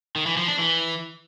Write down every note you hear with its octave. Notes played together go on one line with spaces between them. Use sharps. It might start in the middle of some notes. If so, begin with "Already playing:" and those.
D#3
E3
F3
D4
E3